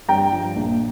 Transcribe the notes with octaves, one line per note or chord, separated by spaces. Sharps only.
G2 G5 A#5
F3
A#1